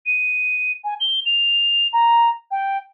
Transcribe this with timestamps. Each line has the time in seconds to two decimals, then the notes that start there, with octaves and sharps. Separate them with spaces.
0.06 D#7
0.84 G#5
1.00 G7
1.25 F7
1.93 A#5
2.51 G5